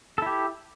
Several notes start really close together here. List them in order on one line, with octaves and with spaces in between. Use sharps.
A4 E4 G4